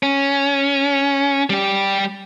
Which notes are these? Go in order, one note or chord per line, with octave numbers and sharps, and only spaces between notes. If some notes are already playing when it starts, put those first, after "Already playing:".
C#4
G3 G4